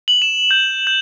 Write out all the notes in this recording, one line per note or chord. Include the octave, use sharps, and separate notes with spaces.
F#7
E7
G6
G6